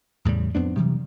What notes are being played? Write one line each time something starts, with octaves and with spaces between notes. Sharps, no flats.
E2 A2 C#3 G3
F2 B3 C4 D4
C3 E3 F#3 G3